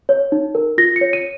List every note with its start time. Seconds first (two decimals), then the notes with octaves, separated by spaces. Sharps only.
0.09 C#5
0.32 D#4
0.55 A#4
0.78 F4 A#6
0.96 C#7
1.01 C#5
1.13 D#7